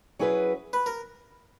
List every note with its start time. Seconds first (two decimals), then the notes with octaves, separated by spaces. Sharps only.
0.19 F#3 C#4 E4 G#4 B4
0.73 B4
0.86 A#4